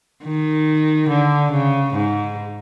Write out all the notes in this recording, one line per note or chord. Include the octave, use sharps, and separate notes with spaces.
D#3
D3
C#3
G#2